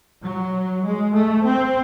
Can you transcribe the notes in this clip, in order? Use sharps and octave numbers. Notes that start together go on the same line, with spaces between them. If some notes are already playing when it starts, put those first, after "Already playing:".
F#3
G#3
A3
C4